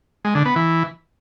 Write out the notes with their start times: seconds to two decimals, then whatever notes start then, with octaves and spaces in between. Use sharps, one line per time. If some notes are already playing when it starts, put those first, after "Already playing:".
0.25 G#3
0.35 D3
0.45 B3
0.56 E3